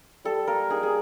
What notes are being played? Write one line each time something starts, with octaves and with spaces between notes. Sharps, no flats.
G3 A4
A#3 A#4
D#4 G#4
G#4